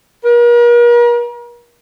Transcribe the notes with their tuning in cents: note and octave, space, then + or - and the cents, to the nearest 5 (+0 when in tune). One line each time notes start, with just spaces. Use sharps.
A#4 +40